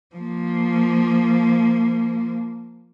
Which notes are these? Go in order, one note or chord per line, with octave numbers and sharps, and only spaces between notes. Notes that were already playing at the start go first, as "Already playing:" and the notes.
F3 A#3